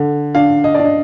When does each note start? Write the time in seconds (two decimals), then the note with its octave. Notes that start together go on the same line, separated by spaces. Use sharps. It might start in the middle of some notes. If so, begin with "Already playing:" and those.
Already playing: D3
0.35 D4 F5
0.64 D#5
0.75 D5
0.79 D4
0.84 D#5